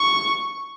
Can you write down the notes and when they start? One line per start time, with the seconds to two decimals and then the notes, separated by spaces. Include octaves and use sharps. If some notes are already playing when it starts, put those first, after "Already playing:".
Already playing: C#6